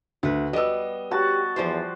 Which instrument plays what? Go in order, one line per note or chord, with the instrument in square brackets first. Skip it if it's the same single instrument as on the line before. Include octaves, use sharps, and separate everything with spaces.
[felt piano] D2 [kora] F#4 B4
[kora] G3 B3 [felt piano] D#5 E6
[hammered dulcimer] F#4 A5 [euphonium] G4
[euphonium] E2 [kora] F3 G3 C5